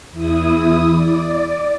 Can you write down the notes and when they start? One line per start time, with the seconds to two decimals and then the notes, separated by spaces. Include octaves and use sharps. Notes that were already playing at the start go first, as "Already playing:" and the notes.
0.12 E2 E4 D#6
0.89 D5